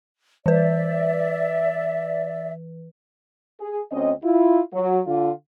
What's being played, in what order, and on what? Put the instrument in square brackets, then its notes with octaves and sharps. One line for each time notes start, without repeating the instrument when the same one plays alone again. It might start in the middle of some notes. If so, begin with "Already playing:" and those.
[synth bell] E3 B4 [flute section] D5 E5
[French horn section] G#4
D2 C4 C#4 D#5
E4 F4
F#3
D3 F4